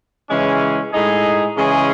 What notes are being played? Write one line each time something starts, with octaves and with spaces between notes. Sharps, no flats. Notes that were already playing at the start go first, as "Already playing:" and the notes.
C#3 E3 G#3 C#4
A2 G#3 D#4 G#4
C#3 E3 G#3 C#4 G#4